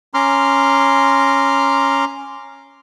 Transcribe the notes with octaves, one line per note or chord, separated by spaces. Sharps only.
C#4 A#5 C6 D6 F6